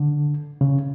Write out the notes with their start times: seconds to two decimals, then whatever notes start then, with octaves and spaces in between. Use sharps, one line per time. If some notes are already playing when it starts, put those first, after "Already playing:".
Already playing: D3
0.61 C#3